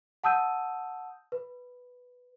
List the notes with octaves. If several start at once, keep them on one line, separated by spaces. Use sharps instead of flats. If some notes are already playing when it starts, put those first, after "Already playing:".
F#5 A5 D#6 E6 G6 D#7
B4